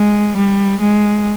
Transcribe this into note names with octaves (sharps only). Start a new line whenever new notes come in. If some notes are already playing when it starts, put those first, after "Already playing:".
Already playing: G#3
G3
G#3